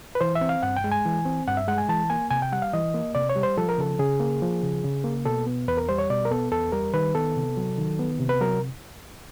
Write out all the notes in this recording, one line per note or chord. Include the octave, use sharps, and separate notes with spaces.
B4
E3 C5
E5
C4
F5
G2 F#5
G5
G#3
G#5
E3
C4
G2 F#5
E5
G#3 F#5
G#5
E3 A5
A#3 G#5
C3 G#5
G5
G3 F#5
F5
E3 D#5
A#3
C3 D5
C#5
G3
C5
F3 A4
A#4
C#3 A4
C#3 G#4
A#3
F3
C#3
C#3
A#3
B2 A4
B3
E2 B4
A#4
G3 C5
C#5
B2 D5
A#4
B3 A4
E2 A4
G3 A#4
D#3 B4
B3 A4
C3
F#3
D#3
B3
C3
B4
F#3 A#4